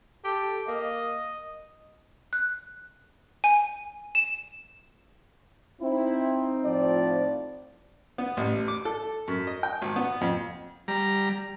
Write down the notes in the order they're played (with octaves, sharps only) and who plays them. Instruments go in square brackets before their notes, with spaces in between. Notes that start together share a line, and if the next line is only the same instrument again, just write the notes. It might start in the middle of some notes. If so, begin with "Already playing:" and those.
[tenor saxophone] G4 [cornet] A4
[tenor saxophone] A#3 [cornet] D#5
[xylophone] F#6
G#5
E7
[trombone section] C4 [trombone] D#4 [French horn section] E4
[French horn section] A2 F3 D5
[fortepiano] B3
A1
D6
A4
F#2
D#5
G5
G#1
B3
F2
[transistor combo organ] G3 A#5